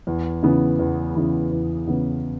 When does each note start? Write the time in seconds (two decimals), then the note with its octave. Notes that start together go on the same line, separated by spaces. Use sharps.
0.07 E2
0.43 C#3 E3 B3
0.79 E2
1.15 C#3 E3 B3
1.52 E2
1.87 C#3 E3 B3